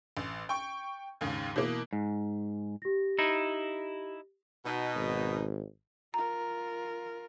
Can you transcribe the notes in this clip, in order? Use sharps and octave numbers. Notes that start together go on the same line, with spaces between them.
A1
G5 C#6
D#2 G#2 C#3
B2 E3 A#3
G#2
G4 A#6
D#4 E4
B2 D#4
G#1
F4 A#4 A#5